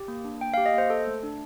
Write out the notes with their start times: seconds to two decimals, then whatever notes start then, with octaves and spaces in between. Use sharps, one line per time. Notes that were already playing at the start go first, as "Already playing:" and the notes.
Already playing: G4
0.08 A#3
0.25 D4
0.41 A#3 G5
0.54 F5
0.57 G4
0.66 D#5
0.74 A#3 C5
0.90 A4
1.07 A3
1.23 D4